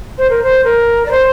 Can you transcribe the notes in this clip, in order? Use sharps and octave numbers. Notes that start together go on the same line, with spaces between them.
C5
A#4
C5
A#4
D5
C5